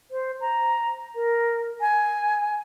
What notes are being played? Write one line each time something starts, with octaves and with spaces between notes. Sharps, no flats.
C5
A#5
A#4
G#5